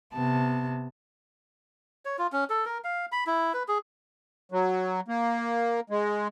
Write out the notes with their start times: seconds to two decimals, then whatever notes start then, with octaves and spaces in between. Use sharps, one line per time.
0.14 C3 B3 A5
2.05 C#5
2.18 F4
2.32 C#4
2.50 A4
2.65 A#4
2.84 F5
3.12 B5
3.27 E4
3.54 B4
3.68 G#4
4.52 F#3
5.08 A#3
5.90 G#3